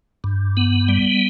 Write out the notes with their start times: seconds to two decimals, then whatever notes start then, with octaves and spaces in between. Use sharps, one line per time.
0.24 G2
0.57 B3
0.88 G3